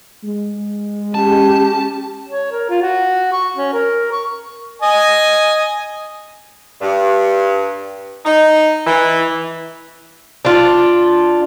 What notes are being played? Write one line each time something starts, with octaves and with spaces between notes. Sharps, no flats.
G#3
C#4 G4 A5
C#5
A#4
F4
F#4
C#6
C#4
A#4
C#6
D#5 G#5
G2
D#4
E3
D4 F4